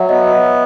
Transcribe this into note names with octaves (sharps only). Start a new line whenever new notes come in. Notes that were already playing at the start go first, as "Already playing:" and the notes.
Already playing: F#3 E5 F#5
B3 D#5